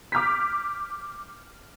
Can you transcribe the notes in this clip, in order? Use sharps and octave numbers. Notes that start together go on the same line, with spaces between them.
D6 F6 G6 B6